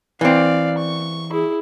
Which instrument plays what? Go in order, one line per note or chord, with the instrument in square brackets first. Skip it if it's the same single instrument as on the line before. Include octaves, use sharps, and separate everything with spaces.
[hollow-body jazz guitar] E3 C4 [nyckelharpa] D5 F5
[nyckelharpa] C#6
E4 G#4